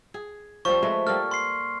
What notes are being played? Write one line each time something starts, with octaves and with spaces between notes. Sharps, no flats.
G#4
F3 G3 C4 C#6
G#3 A3 B4
G3 A#3 A4 F6
C6 C7